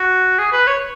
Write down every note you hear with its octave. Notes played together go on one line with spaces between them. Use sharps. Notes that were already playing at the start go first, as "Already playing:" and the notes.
Already playing: F#4
G#4
B4
C#5